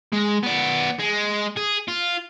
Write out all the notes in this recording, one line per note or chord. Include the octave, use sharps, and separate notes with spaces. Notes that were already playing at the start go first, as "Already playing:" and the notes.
G#3
B3 D5
G#3
G#4
F4